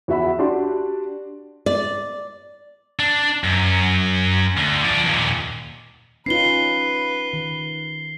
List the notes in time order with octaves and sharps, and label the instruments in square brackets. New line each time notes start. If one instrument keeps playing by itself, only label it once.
[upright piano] E2 F#4 E5 B5
D4 F#4 G4 D5 C6
[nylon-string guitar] D5
[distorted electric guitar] D4
F#2
D2
F3 D5
D#2 A#2
[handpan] C#4 D#4 F4 [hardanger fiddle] B4 [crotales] C7 G7
[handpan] D#3